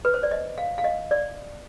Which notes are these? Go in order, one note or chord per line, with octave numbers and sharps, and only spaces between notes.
B4
C5
D5
D#5
F5
F5
D#5
D5